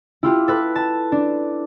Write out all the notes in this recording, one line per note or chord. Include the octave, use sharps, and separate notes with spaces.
E4 F4 G4
A4 B4 F#6
A5
D4